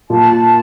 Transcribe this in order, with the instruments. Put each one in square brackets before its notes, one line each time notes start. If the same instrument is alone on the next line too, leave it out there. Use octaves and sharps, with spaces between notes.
[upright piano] A#2 [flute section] A5